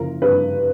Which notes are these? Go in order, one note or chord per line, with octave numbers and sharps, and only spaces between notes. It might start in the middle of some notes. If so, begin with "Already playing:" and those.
Already playing: F#1 F3 A#4
G2 B4